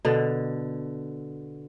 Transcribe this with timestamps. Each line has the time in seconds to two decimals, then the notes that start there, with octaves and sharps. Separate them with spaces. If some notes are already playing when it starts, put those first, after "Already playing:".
0.05 B2 D3